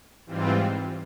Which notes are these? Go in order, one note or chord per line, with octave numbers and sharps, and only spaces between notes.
G#2 E3 G3 C4 F4